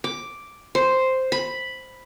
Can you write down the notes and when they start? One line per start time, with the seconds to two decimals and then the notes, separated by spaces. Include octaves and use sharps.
0.04 D6
0.75 C5
1.32 B5